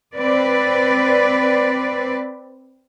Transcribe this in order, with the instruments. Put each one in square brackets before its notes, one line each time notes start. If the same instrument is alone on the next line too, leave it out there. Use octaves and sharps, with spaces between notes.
[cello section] C4 B4 D5